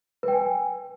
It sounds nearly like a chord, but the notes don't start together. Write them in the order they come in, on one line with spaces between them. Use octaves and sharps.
B4 G5 G#5